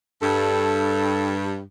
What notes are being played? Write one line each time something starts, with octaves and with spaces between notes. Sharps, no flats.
G2 A4